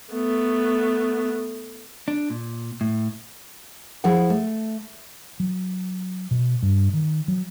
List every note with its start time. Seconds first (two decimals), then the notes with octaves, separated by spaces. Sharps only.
0.13 A3 B3
2.08 D4
2.30 A#2
2.81 A2
4.04 F3 E4 G#4 F#5
4.30 A3
5.40 F#3
6.31 B2
6.63 G2
6.93 D#3
7.28 F#3